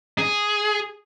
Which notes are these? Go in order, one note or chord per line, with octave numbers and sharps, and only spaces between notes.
G#4